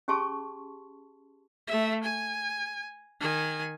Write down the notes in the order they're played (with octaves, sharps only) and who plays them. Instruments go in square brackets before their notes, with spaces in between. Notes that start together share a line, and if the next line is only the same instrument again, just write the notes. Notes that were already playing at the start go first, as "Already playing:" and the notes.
[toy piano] C#4 G4 G#4 A5 C6 C#6
[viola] A3 E5
G#5
D#3 G#5